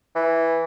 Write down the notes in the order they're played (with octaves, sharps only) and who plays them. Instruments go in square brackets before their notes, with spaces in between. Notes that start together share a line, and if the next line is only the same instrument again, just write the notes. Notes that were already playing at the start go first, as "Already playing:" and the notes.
[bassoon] E3